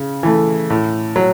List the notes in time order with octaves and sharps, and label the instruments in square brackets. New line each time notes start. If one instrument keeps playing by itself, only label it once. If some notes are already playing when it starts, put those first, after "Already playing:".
Already playing: [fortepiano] C#3
E3 A3
A2
F#3